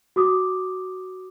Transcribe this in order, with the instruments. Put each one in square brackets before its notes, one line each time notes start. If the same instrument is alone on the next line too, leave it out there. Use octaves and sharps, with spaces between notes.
[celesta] F#4 D6 D#6